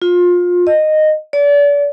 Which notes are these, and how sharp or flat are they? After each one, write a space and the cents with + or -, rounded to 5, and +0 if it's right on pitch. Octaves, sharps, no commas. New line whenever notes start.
F4 +25
D#5 -10
D5 -35